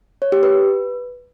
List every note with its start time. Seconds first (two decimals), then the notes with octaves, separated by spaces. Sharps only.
0.22 C#5
0.32 G4
0.43 B4